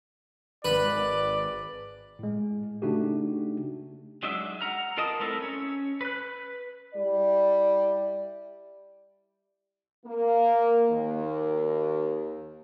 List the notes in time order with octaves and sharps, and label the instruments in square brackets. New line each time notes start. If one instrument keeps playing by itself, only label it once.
[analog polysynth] G#1 [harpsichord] B4 [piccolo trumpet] D5
[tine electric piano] A2 G#3
C#3 A3 D4 D#4 F#4 G4
[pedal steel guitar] F#3 G#3 D4 D#4 E5
F#5 A#5 F6
F4 A#4 D#5 A5 D#6
A3 C4 E4 A4 A#4
C#4 C#5
B4 F#6
[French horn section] G3 E4 D5
A#3
D#2